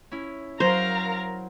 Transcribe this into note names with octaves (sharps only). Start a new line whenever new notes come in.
C#4 E4
F#3 A#4 C5 F5 A#5